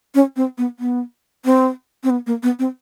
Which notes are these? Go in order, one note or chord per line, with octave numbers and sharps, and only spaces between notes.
C#4
C4
B3
B3
C4
C4
B3
A#3
B3
C4